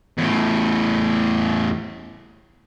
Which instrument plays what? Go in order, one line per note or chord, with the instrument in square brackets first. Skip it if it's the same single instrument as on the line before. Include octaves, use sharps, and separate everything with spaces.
[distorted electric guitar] E2 A2